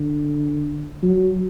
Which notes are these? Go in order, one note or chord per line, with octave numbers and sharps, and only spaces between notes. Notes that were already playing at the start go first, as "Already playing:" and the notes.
Already playing: D3
F#3